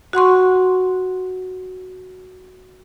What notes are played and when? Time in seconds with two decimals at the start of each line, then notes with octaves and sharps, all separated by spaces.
0.13 F#4 F#5 C6 C#6